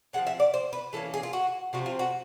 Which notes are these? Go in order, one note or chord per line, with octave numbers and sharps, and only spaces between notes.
F3 G#3 C4 F#5
E5
D5
C5
B4
E3 G3 A#3 C#4 A4
G#4
F4
F#4
C3 F3 A3 C4 F#4
F4
F#4